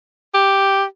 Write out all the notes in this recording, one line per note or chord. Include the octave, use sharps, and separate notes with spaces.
G4